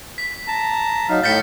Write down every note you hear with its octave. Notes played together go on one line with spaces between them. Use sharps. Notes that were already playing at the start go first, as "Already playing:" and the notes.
B6
A5 A#5
F#3 D#4 F5
A2 G6 A6 B6 C#7